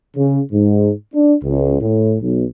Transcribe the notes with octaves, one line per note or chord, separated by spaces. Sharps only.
C#3
G#2
D4
C#2
A2
B1